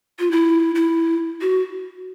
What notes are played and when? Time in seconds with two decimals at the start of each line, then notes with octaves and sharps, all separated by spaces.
0.20 F4
0.31 E4
0.75 E4
1.41 F#4